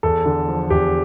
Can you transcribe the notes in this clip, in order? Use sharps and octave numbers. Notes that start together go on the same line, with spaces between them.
E2 A4
D3
F3
E2 G4